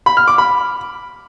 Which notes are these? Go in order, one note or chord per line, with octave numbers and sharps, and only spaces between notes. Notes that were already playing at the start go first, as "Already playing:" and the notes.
B5
F6
D6
B5